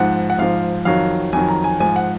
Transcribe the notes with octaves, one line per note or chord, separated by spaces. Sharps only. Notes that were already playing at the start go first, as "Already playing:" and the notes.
Already playing: G#2 F3 F#5
F#5
G#2 F3 F5
F2 D#3 F#3 F5
F2 D#3 F#3 G#5
A#5
G#5
G#2 F3 G#5
F#5